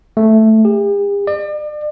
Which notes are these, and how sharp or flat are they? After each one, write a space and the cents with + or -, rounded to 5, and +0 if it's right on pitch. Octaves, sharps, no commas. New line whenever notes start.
A3 +0
G4 +45
D5 +40